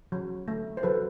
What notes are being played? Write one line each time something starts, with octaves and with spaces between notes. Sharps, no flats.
F#3
A3
C5
F#3 A4 B4